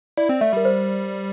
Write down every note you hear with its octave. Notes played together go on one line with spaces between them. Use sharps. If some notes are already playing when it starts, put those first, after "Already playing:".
E4 D5
C4
A3 E5
G3 A#4
C5